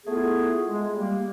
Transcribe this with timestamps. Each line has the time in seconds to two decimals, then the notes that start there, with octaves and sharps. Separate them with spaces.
0.06 A3 B3 E4 F4 G#4
0.67 G#3
0.94 G3 A#3